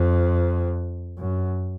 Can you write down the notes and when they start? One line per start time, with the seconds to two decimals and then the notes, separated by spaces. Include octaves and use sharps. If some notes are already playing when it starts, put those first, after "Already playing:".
Already playing: F2
1.18 F#2